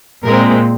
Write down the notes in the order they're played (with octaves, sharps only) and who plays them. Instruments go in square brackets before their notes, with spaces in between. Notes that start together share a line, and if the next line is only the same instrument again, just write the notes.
[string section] A#2 G#3 C4 A#4